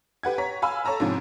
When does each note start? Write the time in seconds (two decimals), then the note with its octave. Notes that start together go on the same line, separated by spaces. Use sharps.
0.23 G4 B4 F#5 G#6
0.38 C#5 A#5 B6
0.62 F5 G#5 B5 E6
0.85 A4 C#5 A5 A#5 E6
1.00 G#2 C3 F3 C#4